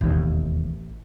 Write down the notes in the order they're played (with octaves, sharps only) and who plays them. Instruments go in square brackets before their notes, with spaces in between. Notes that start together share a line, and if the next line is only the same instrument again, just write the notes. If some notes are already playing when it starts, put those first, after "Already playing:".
[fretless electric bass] E1 D#2 [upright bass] A1